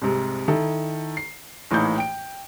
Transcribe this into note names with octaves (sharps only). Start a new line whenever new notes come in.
C2 G#2 C3
D#3 E4 A4
C7
A#1 A2 E3 A#3 D#4 G6
G5 D7